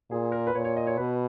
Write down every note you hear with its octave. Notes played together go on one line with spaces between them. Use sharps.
A#2 G#4
A#4
B4
A#2 C#5
C#5
D#5
C#5
B2 B4